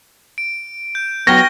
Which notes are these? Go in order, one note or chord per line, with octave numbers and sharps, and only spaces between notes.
D7
G6
F#3 B3 G5 C#6 F6 G#6 A#6 G7